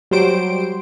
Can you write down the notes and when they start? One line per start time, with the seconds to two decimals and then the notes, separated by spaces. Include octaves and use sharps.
0.11 F#3 G3 C5 D7